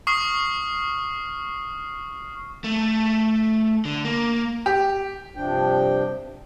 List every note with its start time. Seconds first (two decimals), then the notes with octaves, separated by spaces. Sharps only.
0.07 C#6 D#6 F6 C7
2.64 A3
3.85 D3
4.05 A#3
4.66 G4
5.36 G2 C3 F3 D4 G5